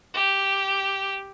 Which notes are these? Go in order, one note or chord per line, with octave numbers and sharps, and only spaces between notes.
G4